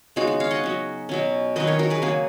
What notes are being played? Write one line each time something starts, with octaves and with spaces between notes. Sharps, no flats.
C#3 G#3 B3 D#4 F#4
F#4
C#5 F5
D#5 F#5
F#3 C#4
B2 F#3 C#4
D#3 F#3 B3 B4 D#5
A#4 C#5
F#4 A#4
G#4 B4
C#3 F#3 A#3 G#4 B4